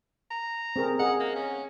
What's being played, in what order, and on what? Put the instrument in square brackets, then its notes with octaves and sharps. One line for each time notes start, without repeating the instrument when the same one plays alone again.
[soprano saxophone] A#5
[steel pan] C4 G#4 A#4
[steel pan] G#4 D#5 [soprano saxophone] F#5
[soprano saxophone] A#3
C#4